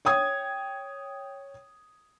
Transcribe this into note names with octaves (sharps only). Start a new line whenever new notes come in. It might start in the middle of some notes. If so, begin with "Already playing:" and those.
C#5 G5 D#6 G#6